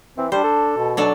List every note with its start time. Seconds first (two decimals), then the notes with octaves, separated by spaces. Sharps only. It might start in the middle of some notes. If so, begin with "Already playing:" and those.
0.18 E3 C4
0.32 G3 D4 C5
0.44 A4
0.77 B2
0.97 F#3 D4 A4